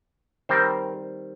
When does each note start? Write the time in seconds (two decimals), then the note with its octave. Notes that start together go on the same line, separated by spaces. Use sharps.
0.49 D#3 G3 C4 A#4 C5